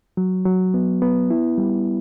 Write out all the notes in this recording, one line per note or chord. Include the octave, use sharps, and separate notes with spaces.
F#3
F#3
B3
B3
E4
G3